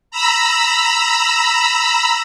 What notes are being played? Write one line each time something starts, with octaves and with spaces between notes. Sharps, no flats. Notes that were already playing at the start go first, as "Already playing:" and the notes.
A#5 B5 E6